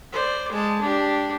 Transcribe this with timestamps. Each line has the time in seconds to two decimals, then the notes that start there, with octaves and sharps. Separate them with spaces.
0.12 C5 D5
0.52 G#3 A5
0.81 D4 G4